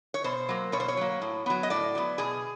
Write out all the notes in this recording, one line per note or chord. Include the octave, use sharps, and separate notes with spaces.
C#5
B2 C5
F#3 A#3
B2 C#5
C5
C#5
F#3 A#3
A2
F#3 B3
D#5
A2 D5
F#3 B3
B2 G#4